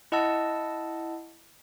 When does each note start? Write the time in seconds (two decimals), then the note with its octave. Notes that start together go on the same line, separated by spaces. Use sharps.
0.12 E4 D#5 F#5 A5 E6